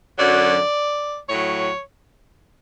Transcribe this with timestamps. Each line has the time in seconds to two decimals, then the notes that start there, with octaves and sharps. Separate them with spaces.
0.17 F#2 D3 F#3 D5
1.29 A2 F#3 C#5